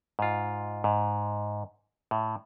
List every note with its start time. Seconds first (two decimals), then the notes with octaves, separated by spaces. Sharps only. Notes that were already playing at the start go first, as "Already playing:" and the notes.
0.19 G#2 F4
0.84 G#2
2.11 A2